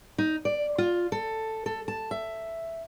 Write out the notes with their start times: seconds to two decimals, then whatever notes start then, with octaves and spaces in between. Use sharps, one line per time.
0.18 D#4
0.45 D5
0.78 F4
1.12 A4
1.66 A4
1.88 A5
2.11 E5